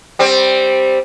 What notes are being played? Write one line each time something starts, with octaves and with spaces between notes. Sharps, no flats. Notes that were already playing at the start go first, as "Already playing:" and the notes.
G3 C4